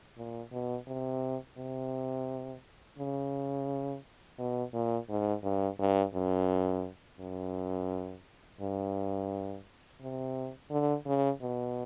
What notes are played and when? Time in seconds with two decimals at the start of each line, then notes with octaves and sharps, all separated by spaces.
0.17 A#2
0.52 B2
0.87 C3
1.58 C3
2.98 C#3
4.39 B2
4.73 A#2
5.09 G#2
5.43 G2
5.80 G2
6.14 F#2
7.20 F#2
8.60 G2
10.01 C3
10.71 D3
11.06 C#3
11.42 B2